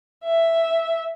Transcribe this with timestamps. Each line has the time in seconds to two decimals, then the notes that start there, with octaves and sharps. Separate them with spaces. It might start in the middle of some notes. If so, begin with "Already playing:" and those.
0.24 E5